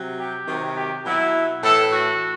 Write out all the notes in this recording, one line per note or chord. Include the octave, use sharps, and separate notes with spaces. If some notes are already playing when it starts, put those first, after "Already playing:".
Already playing: C3 F#3
G4
C3 D#3 F#3
G4
B2 F#3 E4
A2 E3 A4
F#4